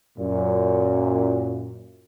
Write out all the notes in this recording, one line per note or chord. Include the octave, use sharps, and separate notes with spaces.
F#2 A#2